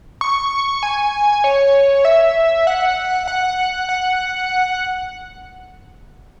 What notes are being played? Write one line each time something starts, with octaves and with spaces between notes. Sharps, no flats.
C#6
G#5
C#5
E5
F#5
F#5
F#5